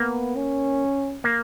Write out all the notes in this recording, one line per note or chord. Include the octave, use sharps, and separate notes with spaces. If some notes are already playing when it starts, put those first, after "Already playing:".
Already playing: A#3 B3
C#4
A#3